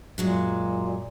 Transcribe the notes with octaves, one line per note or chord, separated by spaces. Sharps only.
F#2 A#2 F#3 G#3